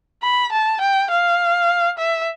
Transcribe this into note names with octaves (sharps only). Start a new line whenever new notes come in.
B5
A5
G5
F5
E5